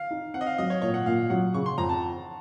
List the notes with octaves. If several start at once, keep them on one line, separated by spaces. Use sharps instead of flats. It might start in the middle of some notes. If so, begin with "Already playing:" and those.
Already playing: F5
D#4
C4 F#5
D#5
F5
F#3 D#5
C#5
A#2 C#5
F#5
A#2 F5
F#3 F#5
C#3 C#6
C6
F2 A#5
A5